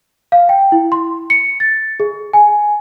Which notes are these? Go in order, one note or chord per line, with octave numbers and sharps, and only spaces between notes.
F5
G5
E4
C6
C#7
A6
G#4
G#5